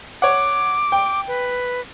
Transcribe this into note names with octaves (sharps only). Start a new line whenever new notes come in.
C#5 F#5 D6
G5
B4